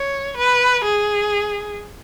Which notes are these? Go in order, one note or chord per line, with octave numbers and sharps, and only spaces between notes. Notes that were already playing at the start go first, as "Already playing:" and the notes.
Already playing: C#5
B4
G#4